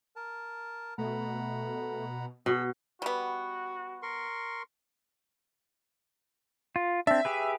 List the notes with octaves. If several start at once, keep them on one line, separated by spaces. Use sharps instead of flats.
A#4 A5
B2 A3 F#5 A#5 B5
B2 G#4 E6
G3 B3 F#4
A#4 C6 C#6
F4
C4 D4 E5
G4 G#4 B4